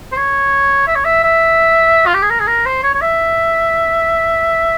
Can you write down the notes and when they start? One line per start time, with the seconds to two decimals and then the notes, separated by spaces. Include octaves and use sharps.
0.12 C5
0.17 C#5
0.87 E5
0.95 C#5
1.05 E5
1.23 E5
2.06 F4
2.14 G4
2.22 G#4
2.30 A#4
2.40 G#4
2.47 A#4
2.65 C5
2.83 C#5
2.94 C#5
3.01 E5